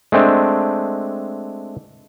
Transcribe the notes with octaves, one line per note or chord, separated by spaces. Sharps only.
G#3 A3 C4 D4